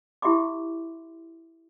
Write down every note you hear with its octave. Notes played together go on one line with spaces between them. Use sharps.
E4 G4 E5 B5 C6 D6